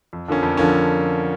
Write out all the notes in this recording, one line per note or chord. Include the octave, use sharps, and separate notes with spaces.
F2
D3 F3 A#3 C#4
F2
D3 F3 A#3 C#4